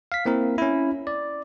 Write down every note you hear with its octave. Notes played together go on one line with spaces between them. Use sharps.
F5 B6
A#3 C4 E4 A#4
C#4 E4
D5